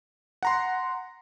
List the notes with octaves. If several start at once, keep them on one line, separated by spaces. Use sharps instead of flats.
F#5 A#5 C6